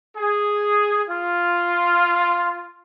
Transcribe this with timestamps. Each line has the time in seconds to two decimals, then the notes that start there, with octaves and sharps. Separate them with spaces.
0.17 G#4
1.10 F4